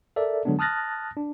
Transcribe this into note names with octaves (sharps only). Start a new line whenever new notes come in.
A4 A#4 D5 E5
D3 F#3 G#3 B3 D4
A5 D#6 F6 F#6 A6 A#6
D4